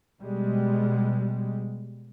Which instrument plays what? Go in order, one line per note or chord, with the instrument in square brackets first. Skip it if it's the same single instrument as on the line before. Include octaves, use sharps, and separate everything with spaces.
[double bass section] B2 G3 G#3